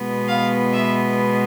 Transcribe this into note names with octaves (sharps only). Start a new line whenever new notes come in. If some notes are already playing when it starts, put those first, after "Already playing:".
Already playing: B2 G#3 B3
F5
E5